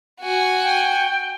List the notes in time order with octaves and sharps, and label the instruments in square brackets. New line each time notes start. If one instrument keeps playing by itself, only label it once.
[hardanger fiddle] F#4 G#5
[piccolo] G5